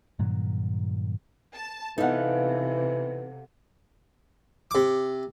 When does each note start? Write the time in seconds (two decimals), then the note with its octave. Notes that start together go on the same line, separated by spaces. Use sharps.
0.19 G2 A#2 D#3 F#3
1.55 A5
1.98 C3 E3 B3 D#4 A4 F5 F#5
4.71 C3 D6